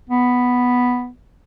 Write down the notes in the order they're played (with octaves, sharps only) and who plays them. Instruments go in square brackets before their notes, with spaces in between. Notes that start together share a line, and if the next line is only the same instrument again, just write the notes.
[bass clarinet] B3